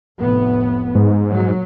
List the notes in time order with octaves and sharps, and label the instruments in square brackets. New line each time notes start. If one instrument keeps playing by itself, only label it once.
[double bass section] F1 A2 B3
[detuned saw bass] G#2
[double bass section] A#2 F#3